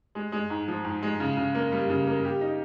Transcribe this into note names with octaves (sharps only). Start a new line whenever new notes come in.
G#3
G#3
G#2
F3
G#2
G#3
C#3
C#3
A#3
G3
C#3
A#3
G4
D#4